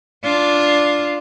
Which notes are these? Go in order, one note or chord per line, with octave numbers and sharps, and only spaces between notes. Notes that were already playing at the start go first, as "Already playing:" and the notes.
D4 F4